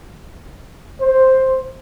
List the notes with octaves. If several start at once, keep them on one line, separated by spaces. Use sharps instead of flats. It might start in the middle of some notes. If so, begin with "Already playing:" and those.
C5